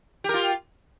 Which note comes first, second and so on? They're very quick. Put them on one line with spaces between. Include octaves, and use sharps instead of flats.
G4 A#4 F4